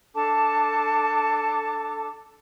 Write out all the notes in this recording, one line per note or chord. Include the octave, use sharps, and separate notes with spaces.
D4 A4 A5 D6